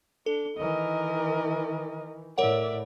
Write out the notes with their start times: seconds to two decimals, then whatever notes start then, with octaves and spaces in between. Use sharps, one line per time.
0.26 D4 A4
0.58 D#3 E3 A#4 D#5
2.38 A2 A#4 C#5 D5 E5 F#5